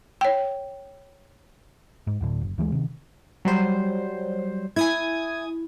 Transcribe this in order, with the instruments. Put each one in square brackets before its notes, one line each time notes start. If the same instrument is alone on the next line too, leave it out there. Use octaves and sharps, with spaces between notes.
[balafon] C#5 G5
[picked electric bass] G#2
D2 A2 D3
F#1
D2 E3 F3 G#3
C3 D#3
[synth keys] F#3 G3 C5
[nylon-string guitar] E4 [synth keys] G#5 D#6 G#6